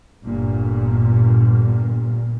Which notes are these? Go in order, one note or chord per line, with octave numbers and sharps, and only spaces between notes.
G1 A#2